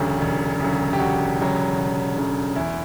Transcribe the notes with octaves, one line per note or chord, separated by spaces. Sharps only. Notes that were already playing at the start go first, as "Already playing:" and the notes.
Already playing: E1 D2 C#3 F#3 G4
E1
D2 C#3 F#3
G4
E1 F#4
D2 C#3 F#3
E1
D2 C#3 F#3
E2 E4